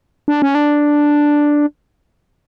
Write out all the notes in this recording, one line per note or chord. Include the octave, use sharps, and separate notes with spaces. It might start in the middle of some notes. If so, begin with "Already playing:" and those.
D4
C#4
D4